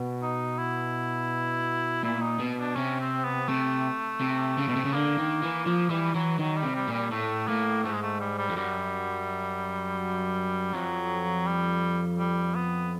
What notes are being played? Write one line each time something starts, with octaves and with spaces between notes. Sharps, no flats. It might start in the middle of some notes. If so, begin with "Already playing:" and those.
Already playing: B2
D#4
E4
A#2 E4
D#4
B2
D4
C3 C#4
C4
B3
C3 A3
C3
C#3
B2
C3
C#3
D3 A#3
D#3
E3
F3 A#3
E3 G3
E3 F#3
D#3 F#3
G3
C3
G3
A#2
G3
A2 A3
A2 A#3
G#2 A3
G#3
A3
G3
G3
F2
F#2 G3
F2 F#3
G3
G3
B3